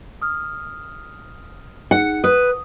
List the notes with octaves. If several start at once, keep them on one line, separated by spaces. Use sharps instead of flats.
D#6 F6
D#4 G#4 F#5 C#7
B4 D#6